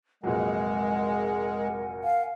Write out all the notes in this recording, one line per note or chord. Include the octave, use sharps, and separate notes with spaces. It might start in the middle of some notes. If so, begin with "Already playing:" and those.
F1 A#2 F#3 G#3 A#4 F#5 G#5
F5